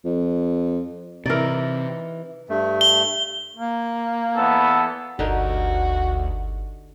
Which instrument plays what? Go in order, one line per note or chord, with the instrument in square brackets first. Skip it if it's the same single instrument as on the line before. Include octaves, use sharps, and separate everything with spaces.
[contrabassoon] F2
[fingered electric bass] C3 [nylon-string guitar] E3 D#4 [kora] A#4 D5
[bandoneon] G2 A3
[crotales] G7
[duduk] A#3
[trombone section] E2 B3 A4
[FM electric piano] G1 [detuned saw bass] D2 [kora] D3 D#4 A#4 [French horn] F#4